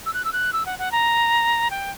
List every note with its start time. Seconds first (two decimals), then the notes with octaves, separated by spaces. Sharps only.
0.06 E6
0.14 F#6
0.24 E6
0.33 F#6
0.53 E6
0.66 F#5
0.79 F#5
0.92 A#5
1.70 G5